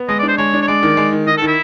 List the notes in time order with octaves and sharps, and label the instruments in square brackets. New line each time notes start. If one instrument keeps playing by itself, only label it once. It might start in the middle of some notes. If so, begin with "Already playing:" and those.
Already playing: [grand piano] B3
[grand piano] G#3 [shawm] D#5
[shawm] D5
[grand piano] D4 [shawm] C5
[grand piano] G#3 [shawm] C#5
[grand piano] D4
[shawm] C#5
[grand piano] G#3 [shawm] D5
[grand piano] D#3
G#3
D#3
[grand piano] D#3 [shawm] D#5
[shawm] A4
[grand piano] D#3 [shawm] E4